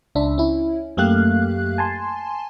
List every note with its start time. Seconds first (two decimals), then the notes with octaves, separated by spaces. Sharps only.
0.15 C#2 D4 E5
0.38 C#4 E4
0.97 F#2 A3 A#3 G4 F5 F#6
1.78 G#5 A5 C6